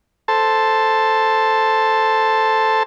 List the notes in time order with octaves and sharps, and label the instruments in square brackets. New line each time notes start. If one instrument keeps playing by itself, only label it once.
[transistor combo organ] A4 C5 A5